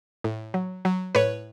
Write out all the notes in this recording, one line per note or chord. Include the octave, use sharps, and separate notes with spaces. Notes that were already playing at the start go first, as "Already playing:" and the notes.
A2
F#3
F#3
A2 B4 C#5